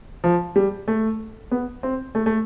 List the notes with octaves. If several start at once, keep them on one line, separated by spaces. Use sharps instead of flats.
F3
G3
A3
B3
C4
A3
A3